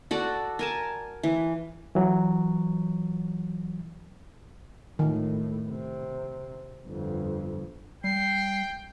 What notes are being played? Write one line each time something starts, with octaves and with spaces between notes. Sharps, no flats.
F#4 A4 D5
A#4 G#5 A5
E3
E3 F#3
A2 D#3
C3
G1 F2
G3 G5 C7